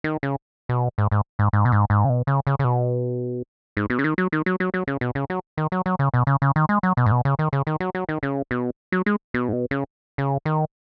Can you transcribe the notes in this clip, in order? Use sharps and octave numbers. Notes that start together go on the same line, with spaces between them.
D#3
C#3
B2
G#2
G#2
G#2
G#2
B2
G#2
G#2
C#3
B2
C#3
C#3
C#3
B2
G#2
B2
C#3
D#3
F#3
D#3
F#3
F#3
F#3
C#3
B2
C#3
F#3
D#3
F#3
F#3
C#3
B2
C#3
C#3
D#3
G#3
F#3
B2
G#2
B2
C#3
D#3
C#3
D#3
F#3
F#3
D#3
C#3
B2
F#3
G#3
B2
G#2
B2
C#3
C#3
D#3